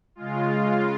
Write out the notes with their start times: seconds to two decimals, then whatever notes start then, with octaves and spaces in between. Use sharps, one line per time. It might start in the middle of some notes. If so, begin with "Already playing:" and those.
0.15 C#3 G#3 F4
0.48 F4